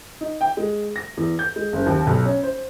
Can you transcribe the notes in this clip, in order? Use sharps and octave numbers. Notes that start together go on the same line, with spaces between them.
D#4
G5
G#3
A#6
E2
G6
G#3
F#1
D#2
B1
C#4
C5